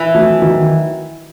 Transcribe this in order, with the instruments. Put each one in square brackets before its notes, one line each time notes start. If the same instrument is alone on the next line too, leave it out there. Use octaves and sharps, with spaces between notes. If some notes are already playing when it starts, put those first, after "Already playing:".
Already playing: [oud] E3
[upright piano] F#3 A3
D#3 F#3